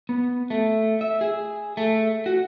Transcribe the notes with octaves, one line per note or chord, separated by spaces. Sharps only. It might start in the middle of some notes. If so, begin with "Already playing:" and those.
B3
A3
E5
G#4
A3
F#4